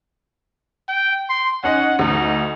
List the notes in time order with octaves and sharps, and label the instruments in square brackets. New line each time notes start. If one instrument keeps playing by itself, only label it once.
[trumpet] G5
C6
[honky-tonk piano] C#4 D#4 D#5 [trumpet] F#5
[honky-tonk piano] D2 [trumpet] D#4